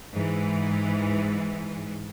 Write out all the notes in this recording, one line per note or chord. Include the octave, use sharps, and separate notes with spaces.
G#2 E3